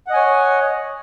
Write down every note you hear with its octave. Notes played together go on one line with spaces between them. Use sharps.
C#5 D#5 F#5 G#5